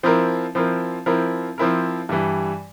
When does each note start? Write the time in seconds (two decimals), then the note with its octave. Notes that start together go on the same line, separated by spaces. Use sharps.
0.03 F3 C4 E4 A#4
0.55 F3 C4 E4 A#4
1.06 F3 C4 E4 A#4
1.58 F3 C4 E4 A#4
2.09 G2 E3 G3